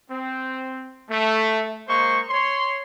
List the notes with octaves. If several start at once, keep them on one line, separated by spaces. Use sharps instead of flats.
C4
A3
G#3 A#3 C5 C6 C#6
C#5 C6